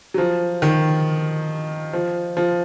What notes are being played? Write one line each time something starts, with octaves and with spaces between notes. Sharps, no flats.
F#3
F3
D#3
F3
F3